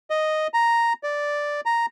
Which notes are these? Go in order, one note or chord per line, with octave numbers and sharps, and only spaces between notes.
D#5
A#5
D5
A#5